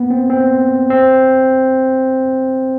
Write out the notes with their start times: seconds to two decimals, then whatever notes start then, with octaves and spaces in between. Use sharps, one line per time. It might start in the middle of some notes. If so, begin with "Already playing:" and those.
Already playing: A#3 B3
0.10 C4
0.30 C4
0.90 C4